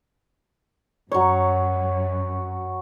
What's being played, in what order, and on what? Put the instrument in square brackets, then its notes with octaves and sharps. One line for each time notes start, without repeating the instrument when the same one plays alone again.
[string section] F#2 [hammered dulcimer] F#3 C#5